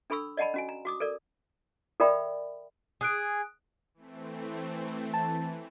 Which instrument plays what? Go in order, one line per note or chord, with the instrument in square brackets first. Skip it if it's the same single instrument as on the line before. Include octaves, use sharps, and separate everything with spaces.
[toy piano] D4 A4 B5 C#6 E6
D5 D#5 F#5 A5 B5
C#4 F#4 G#5
A#5
F#4 D6 D#6
A4 A#4 D5
A4 A#4 D5 E5 G5 B5
[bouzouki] G#4 [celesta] D#6 F#6 D7
[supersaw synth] E3 A3 C4
[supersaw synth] E3 [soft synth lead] A5